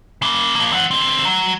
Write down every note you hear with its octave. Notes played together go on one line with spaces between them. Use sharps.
C#3 A#3
F3 A#3
C4 F#5
D3 C4
F#3